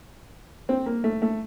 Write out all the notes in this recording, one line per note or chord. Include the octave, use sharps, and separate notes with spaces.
C4
A#3
A3
A3